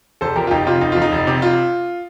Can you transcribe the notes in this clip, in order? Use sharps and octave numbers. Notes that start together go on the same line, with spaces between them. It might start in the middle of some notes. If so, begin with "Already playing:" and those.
F1 A4 C5
F2 G4 A#4
F4
F1 D#4 G4
C3 F4
F1 D#4
F2 F4
D#4
F1
C3
F4